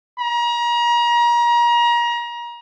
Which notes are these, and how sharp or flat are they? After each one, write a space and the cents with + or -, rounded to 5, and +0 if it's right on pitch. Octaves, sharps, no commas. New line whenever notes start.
A#5 +35